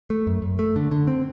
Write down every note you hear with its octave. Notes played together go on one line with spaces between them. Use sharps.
A3
F#2
F#2
A3
D3
D3
C4